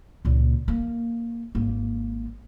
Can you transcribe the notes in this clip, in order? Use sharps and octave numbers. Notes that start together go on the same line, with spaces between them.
C#2 A#2
A#3
G#1 A#3